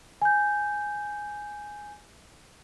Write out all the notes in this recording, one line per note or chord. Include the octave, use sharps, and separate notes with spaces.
G#5 G6